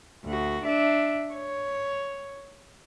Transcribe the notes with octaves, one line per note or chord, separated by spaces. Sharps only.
D2 F#4
D4 E5
C#5